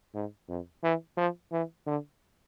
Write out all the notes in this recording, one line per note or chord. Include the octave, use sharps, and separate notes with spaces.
G#2
F2
E3
F3
E3
D3